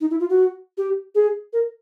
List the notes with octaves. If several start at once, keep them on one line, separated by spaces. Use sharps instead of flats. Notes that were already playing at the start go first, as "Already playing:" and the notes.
D#4
E4
F4
F#4
G4
G#4
A#4